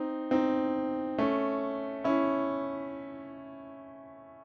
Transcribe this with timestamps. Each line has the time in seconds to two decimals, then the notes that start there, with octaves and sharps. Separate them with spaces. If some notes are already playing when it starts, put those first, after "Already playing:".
Already playing: C4 D#4
0.31 C4 D#4
1.18 A3 C#4
2.04 C#4 E4